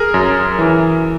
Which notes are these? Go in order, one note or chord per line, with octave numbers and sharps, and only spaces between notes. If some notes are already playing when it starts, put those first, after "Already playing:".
Already playing: G#4 A#4
F#2
E3